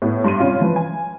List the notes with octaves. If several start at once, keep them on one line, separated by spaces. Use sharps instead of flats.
A2 B3
G2 C6 D#7
C3 C#4 F4 F5
E3 F3 B4
G#5